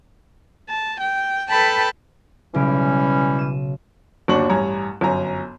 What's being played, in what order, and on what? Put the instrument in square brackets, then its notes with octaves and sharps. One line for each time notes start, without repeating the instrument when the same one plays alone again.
[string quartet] A5
G5
A4 B4 G5 A5 B5
[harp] B1 C#3 D7 [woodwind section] E3 G3 C#4
[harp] D#7 E7
[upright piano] G1 D#2 D4 F#4 C#6 F#7
A1 G2 C#5 G#5 A#5
G1 F#2 G#5 A#5